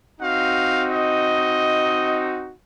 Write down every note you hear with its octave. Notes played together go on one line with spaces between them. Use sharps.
C4 D#4 F#4 F5
D#5